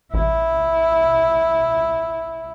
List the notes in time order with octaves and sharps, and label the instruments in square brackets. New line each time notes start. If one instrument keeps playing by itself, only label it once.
[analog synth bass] A1 [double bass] E4